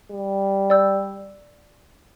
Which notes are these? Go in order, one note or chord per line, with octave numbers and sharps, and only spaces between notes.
G3
D5 E6 G6